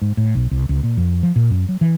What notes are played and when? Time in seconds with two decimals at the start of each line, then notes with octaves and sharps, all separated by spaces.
0.02 G#2
0.17 A2
0.35 B1
0.51 C2
0.69 C#2
0.83 A#2
0.97 F2
1.23 F3
1.36 A#2
1.50 F#2
1.69 F#3
1.81 E3